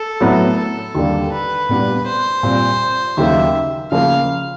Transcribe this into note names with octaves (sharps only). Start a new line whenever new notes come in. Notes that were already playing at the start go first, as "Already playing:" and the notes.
Already playing: A4
A2 F#3 B3
A4
D#2 D3 G3 A#3
B4
A#2 G3 B3 D4 G4
C5
A#2 G3 C4 F4
D#2 C#3 F#3 A#3 D#4 E5
C#3 F3 A#3 F5